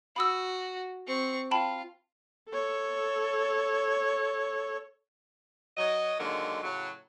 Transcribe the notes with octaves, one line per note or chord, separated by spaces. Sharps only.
F#4 B5 D#6 E6
C4 C#6
F4 G5 A5 B5
A4 C#5
F#3 D#5
D3 D#3 F#3 G#3 A#3
A2 C#3 F#3